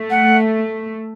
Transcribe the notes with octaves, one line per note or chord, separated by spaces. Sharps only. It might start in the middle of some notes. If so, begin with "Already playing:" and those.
Already playing: A3
F#5